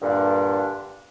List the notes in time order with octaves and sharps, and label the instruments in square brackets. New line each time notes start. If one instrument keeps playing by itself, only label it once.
[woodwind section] G2 A#2 D3 D4